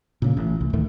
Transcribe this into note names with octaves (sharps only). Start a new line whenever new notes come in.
A#2 C#3 A#3
A1
C2
D2 A2 D#3 A3